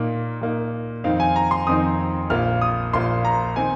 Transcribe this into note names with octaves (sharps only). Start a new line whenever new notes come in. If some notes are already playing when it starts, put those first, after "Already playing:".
Already playing: A#2 A#3 D#4
A#2 A#3 D#4
F2 D#3 C4 D#4 F5
G#5
A#5
C6
F2 D#3 C4 D#4 D#6
A#1 A#2 A#3 F4 F6
D#6
A#1 A#2 A#3 F4 C6
A#5
D#3 C4 D#4 G#5